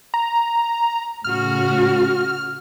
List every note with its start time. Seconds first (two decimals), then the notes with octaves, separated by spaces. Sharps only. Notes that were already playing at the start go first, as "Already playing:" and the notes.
0.14 A#5
1.24 A2 C#3 F#4 F6